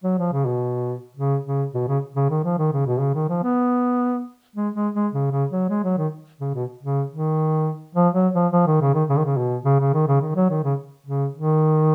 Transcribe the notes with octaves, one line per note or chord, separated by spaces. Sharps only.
F#3
F3
C#3
B2
C#3
C#3
B2
C#3
C#3
D#3
F3
D#3
C#3
B2
C#3
D#3
F3
B3
G#3
G#3
G#3
C#3
C#3
F#3
G#3
F#3
D#3
C#3
B2
C#3
D#3
F3
F#3
F3
F3
D#3
C#3
D#3
C#3
D#3
C#3
B2
C#3
C#3
D#3
C#3
D#3
F#3
D#3
C#3
C#3
D#3